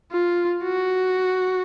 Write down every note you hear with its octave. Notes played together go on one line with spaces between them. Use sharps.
F4
F#4